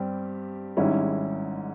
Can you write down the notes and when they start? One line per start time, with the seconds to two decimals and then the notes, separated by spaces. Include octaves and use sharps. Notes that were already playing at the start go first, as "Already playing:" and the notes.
Already playing: G2 G3 C4 G4
0.77 G#1 G#2 G3 C#4 E4